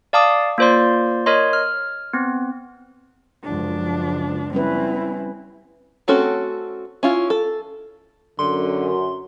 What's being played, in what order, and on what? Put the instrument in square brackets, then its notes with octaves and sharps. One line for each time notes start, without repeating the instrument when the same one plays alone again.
[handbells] D5 F5 A5 D6 D#6
A#3 F4 C5 D5 C6
A#4 C#5 D#5 C6
F6
B3 C4
[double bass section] C#2 F#2 F3 [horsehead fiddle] D4
[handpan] G3 C#4 B4 [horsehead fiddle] C4 E4
[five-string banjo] A3 C4 C#4 F#4 A4
C#4 E4 F4
A4
[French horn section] F#2 [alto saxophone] D3 [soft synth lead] C6